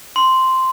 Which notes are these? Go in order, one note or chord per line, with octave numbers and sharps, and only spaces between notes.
C6